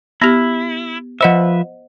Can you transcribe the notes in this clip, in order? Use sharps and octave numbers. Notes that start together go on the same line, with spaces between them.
B3 E4 G4
F3 B4 C5 D#5 E5 F#5